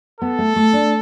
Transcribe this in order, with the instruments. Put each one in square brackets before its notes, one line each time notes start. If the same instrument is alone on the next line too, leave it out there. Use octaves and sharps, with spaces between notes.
[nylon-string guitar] B3 [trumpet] A4
[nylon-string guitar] A3
A3
D4